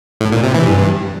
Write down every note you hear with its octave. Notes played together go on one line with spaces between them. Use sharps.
A2
A#2
C3
E3
G2